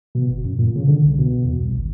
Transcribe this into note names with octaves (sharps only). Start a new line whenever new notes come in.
B2
F#1
F#2
A#2
C#3
D3
C2
B2
E2
C2
G#1